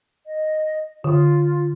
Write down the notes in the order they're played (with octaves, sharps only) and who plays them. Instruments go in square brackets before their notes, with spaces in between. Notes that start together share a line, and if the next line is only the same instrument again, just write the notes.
[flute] D#5
[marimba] D3 [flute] F4